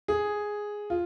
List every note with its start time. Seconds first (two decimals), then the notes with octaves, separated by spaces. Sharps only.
0.08 G#4
0.90 F4